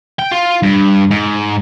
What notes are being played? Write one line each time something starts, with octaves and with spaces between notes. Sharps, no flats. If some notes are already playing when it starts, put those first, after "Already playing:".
G5
F4
G2
G#2